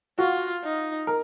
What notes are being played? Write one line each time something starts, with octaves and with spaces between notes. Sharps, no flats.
F4 F#4
D#4
A#4